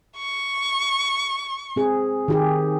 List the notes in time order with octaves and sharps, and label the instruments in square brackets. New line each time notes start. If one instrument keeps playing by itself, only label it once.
[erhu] C#6
[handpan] C4 G#4
D#3 G4 G#4